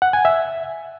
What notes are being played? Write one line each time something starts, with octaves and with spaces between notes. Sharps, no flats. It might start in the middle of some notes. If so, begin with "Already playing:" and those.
F#5
G#5
E5